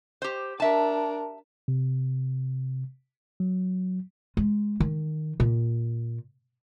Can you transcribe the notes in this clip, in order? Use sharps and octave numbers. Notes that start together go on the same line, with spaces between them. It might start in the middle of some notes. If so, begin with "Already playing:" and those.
G4 C5
D4 A#4 E5 A5
C3
F#3
G#3
D#3
A#2